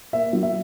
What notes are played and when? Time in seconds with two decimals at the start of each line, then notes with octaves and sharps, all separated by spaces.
0.13 A#3 E5
0.33 F#3
0.43 E5